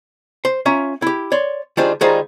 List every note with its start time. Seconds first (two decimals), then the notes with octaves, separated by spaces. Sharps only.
0.45 C5
0.66 C#4 F4 E5 A#5
1.02 E4 G4
1.32 C#5 D5 C6
1.77 D#3 G3 G#3 D4 F4 C5
2.01 D#3 G3 G#3 D#4 F4 C5